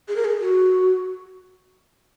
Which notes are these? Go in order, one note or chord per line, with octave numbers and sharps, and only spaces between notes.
G#4
A#4
G#4
F#4